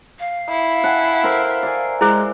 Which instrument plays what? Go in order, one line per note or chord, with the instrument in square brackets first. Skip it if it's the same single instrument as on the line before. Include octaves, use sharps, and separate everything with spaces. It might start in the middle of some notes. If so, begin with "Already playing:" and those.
[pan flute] F5
[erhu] E4
[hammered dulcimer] F#5 G#5 A5
A#4 C5 E5
D5 E5 G#5
[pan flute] G#3 [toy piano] E4 G#4 C5